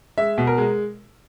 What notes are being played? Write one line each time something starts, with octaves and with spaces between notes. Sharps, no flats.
G#3 E5
B2
A#4
G#3